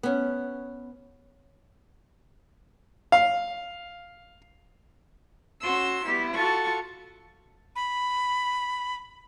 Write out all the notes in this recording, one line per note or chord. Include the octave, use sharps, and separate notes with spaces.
B3 C#4
F5
C#4 F#4 C6 E6
G3 B3 E4
F4 F#4 A4 C#6
B5